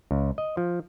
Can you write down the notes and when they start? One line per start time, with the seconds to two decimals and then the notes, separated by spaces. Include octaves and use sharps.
0.11 C#2
0.38 D#5
0.57 F3